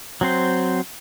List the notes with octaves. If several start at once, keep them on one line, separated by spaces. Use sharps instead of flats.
F#3 C4 C5